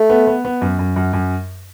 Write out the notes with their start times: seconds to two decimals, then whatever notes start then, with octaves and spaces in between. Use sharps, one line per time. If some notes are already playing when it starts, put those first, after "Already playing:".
Already playing: A3
0.10 B3
0.27 B3
0.45 B3
0.61 F#2
0.79 F#2
0.96 F#2
1.13 F#2